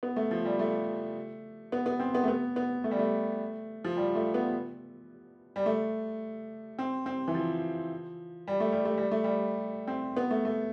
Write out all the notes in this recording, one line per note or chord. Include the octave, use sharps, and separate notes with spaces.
B3
A3
F3
G3
A3
B3
B3
C4
B3
A3
B3
B3
A3
G3
A3
F3
G3
A3
B3
G3
A3
C4
C4
E3
F3
G3
A3
G3
A3
G3
A3
G3
C4
B3
A3
A3